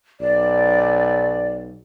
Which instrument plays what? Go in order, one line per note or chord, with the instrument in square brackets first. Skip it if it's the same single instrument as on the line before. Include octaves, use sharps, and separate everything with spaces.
[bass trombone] B1 [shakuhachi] D5